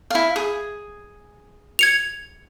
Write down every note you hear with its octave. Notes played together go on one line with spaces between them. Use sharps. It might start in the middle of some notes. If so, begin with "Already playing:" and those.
E4 F5
G#4
G#6 C#7 F7